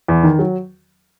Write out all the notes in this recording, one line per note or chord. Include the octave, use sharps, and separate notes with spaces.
E2
D#3
F#3